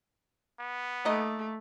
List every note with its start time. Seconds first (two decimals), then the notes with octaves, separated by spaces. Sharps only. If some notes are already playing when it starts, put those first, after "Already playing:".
0.59 B3
1.05 A3 A#3 D#4 D#5